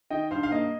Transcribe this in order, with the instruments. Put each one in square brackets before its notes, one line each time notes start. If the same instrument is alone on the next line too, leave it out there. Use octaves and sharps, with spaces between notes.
[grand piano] D#3 D#5 G5
G2 C5 F5
F5
A#3 D#5